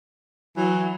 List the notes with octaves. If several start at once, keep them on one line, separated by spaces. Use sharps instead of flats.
E3 F#3